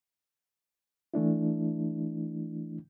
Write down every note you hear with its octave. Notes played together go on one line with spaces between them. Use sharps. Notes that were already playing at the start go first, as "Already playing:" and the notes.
E3 A3 D4 E4